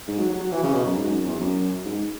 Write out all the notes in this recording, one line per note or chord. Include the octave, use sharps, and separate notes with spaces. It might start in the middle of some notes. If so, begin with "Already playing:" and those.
G#2
F#3
F#3
F#3
E3
C#3
B2
F#2
G#2
F#2
E2
F#2
G#2